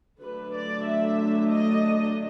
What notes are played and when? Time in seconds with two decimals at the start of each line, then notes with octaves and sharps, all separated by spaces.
0.21 D3 F#3 A3 D4 B4
0.53 D5
0.86 E5
1.50 D#5